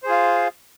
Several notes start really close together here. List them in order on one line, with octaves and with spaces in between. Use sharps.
C5 G#4 F4 F5